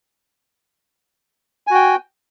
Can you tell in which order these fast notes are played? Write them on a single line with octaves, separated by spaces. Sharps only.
G#5 F#4 G5